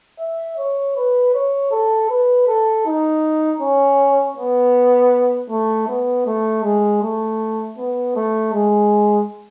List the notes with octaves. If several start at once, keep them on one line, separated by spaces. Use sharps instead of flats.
E5
C#5
B4
C#5
A4
B4
A4
D#4
C#4
B3
A3
B3
A3
G#3
A3
B3
A3
G#3